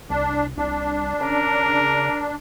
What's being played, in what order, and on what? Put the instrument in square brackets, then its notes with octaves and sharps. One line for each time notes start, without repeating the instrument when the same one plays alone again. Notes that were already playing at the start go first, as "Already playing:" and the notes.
[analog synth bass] C2 [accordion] D4
[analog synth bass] C2 [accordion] D4
[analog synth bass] C#3 [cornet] A#4